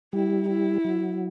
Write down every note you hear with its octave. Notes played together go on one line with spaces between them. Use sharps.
G3 E4
E4
F#3